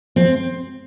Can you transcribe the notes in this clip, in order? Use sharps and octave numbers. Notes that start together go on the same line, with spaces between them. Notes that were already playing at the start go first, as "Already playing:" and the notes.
C4